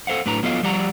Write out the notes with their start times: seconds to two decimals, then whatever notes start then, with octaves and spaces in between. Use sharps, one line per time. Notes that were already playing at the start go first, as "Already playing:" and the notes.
0.07 A4 C5 F5 F#5
0.26 A2 F#3 D4 B4 A#5
0.43 F#3 B3 F4 A4 D#5 F5
0.63 F3 G3 G4 D5 F#5 A#5